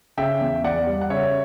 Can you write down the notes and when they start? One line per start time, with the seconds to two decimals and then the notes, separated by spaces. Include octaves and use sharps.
0.17 C#3 E5 G5
0.41 E2
0.64 E2 D5 F#5
0.87 G3
1.01 F#5
1.10 C#3 C#5 E5